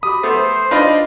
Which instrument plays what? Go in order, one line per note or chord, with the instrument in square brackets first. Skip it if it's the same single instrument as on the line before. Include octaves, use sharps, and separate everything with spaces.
[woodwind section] F#4 G4 B5 [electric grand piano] D#6
[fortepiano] A3 B3 [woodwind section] C5
[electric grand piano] D4 D5 D#5 [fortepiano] D#4 F4 B4